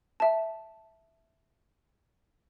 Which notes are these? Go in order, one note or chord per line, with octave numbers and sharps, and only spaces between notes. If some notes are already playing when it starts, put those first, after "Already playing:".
E5 A5